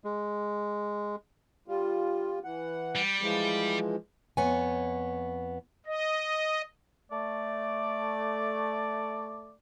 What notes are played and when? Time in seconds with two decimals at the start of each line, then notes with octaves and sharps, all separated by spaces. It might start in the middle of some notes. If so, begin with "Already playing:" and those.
0.04 G#3
1.68 G3 F4
2.44 E3 F#5
2.95 G3
3.22 E3 F3 G#3
4.37 F2 B3 C#5 G#5
5.86 D#5
7.11 A3 D5